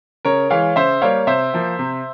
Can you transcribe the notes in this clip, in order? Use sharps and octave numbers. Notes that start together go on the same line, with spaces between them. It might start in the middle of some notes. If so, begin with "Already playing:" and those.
C#3 A#4 C#5
E3 G#3 C#5 F5
C#3 C5 E5
G3 A#3 C#5 F5
C3 C5 E5
F3 A#3
C3